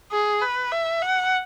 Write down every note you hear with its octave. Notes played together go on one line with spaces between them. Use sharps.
G#4
B4
E5
F#5